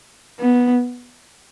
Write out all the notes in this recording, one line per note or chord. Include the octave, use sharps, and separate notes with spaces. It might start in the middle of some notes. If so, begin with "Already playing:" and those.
B3